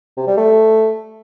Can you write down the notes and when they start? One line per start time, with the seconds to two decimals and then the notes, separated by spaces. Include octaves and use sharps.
0.17 C3
0.27 G3
0.37 A3